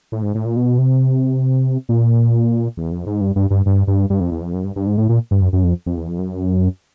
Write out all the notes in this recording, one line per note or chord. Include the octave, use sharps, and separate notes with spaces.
A2
G#2
A2
A#2
B2
C3
A#2
E2
F2
G#2
G2
G2
G2
G2
G2
G2
F2
E2
F2
F#2
G2
G2
G#2
A2
A#2
G2
F#2
F#2
F2
F2
E2
F2
F#2